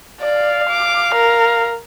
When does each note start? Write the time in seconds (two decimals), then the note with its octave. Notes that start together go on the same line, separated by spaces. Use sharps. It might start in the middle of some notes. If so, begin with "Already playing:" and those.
0.21 D5 F5
0.70 D6
1.15 A#4